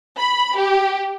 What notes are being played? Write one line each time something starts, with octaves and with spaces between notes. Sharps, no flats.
B5
G4